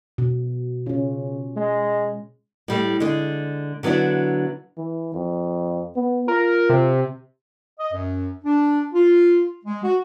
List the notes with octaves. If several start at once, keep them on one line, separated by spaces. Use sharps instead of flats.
B2
C#3 C#4 F4
G#3
A2 G3 A3
D3 G#3
D3 F#3 B3 D4 E4
E3
F2
B3
F4 A#4
C3
D#5
F#2
D4
F4
G#3
F#4